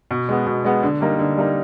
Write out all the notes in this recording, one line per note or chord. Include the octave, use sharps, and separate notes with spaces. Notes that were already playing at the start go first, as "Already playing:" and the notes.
B2
G#3 B3
B2
G#3 B3
D3
G3 A#3 D#4
D3
G3 A#3 D#4